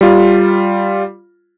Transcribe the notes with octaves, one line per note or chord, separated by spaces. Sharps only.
G3 F4